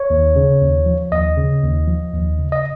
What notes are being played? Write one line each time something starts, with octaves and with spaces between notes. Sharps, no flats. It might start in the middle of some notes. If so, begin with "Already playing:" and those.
Already playing: C#5
D#2
C#3
D#2
F3
D#2 D#5
C#3
D#2
F3
D#2
C#3
D#5